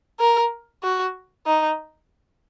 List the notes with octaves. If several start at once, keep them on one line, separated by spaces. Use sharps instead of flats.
A#4
F#4
D#4